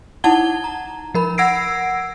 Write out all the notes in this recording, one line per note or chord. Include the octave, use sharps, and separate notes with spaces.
D#4 E4 F#5 A5 G#6 G7
A#5
F3 A#4 B5
F#5 E6 G#6 A#6 C7 D7